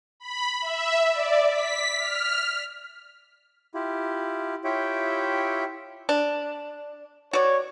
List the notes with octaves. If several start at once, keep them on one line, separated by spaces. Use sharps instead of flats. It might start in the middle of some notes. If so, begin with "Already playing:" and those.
B5
E5
D5
B6
F6
E4 F4 G4
E4 F4 G4 C#5 E5 G5
D4
F#4 C#5 D5